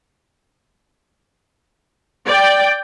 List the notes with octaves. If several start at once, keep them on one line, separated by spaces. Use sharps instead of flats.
D5 G5